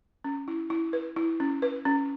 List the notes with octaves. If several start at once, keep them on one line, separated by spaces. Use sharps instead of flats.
C#4
E4
E4
B4
E4
C#4
B4
C#4